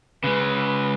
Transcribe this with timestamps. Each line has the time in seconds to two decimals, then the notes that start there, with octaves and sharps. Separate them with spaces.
0.24 C#3 G#3 B4